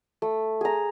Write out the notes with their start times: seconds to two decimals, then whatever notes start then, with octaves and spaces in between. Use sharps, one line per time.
0.22 A3
0.61 G#4 A#5